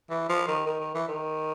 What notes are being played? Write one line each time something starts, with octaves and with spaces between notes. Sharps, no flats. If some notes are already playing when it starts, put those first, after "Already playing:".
E3
F3
D#3
D#3
D#3
E3
D#3